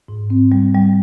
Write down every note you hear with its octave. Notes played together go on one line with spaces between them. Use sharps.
G#2
C4
G3
G3